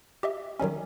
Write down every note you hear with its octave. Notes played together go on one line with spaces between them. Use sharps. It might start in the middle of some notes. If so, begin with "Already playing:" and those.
G4 D#5 E5
D#3 F#3 G3 C#4